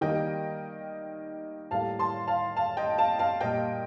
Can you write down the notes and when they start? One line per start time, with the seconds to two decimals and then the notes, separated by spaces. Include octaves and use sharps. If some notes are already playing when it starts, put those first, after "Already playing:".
0.01 D#3 G3 A#3 D#5 G5
1.71 A2 G3 A#3 F5 A5
1.99 A5 C6
2.27 F5 A5
2.56 F5 A5
2.77 D#5 G5
2.98 F5 A5
3.19 F5 A5
3.41 A#2 G3 A#3 D#5 G5